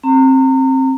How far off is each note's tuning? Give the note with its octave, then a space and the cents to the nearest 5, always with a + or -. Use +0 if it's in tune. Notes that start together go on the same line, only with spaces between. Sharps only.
C4 +20 A#5 -30